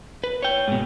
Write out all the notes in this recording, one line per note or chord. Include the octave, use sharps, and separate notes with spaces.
B4
C#5 G5
G#2 B2